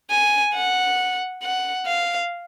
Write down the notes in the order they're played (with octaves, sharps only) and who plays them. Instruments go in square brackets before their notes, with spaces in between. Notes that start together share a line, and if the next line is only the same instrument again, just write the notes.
[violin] G#5
F#5
F#5
F5